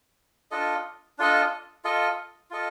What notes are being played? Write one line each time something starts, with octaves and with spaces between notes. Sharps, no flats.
D4 F4 A4 D#5
D4 F4 A4 D#5
F4 A4 D#5
F4 A4 D#5